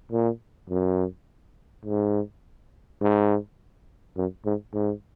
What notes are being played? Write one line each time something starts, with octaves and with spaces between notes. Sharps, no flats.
A#2
F#2
G#2
G#2
F#2
G#2
G#2